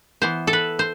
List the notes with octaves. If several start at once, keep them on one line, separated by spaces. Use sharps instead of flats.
E3 B3 C5
A4
B4
C5